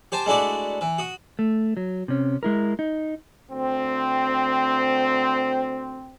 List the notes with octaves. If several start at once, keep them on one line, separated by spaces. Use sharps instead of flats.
G4 C5 G#5 A5
G#3 A3 D4 E4 F#4 D5
E3
F#4 D#6
A3
F#3
C3 C#4
G#3 E4 A#4
D#4
D2 C4